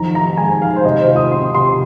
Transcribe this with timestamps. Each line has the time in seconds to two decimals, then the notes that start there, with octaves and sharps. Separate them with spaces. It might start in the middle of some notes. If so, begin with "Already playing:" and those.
Already playing: F2 D#3 A#5
0.15 D#4 A#5
0.37 G#3 G#5
0.61 D#3 F5
0.76 C5
0.85 C3 D#5
0.99 C5
1.07 F4
1.16 D#6
1.31 C4 C6
1.54 C3 C6